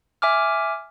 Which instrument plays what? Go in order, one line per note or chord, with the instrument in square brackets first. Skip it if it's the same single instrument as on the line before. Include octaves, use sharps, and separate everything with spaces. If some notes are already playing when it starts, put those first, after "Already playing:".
[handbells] E5 G#5 D6 F6